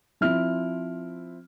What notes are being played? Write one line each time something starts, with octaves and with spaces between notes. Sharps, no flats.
F3 C4 E4 F6